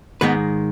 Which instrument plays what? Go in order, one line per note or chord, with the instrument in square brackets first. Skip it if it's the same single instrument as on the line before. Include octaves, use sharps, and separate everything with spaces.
[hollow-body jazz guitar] G#2 D#3 G#3 B3 B4